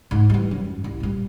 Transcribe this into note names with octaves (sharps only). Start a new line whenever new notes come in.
G#2 A3
E3 G3
F#2
C2
A#2 G3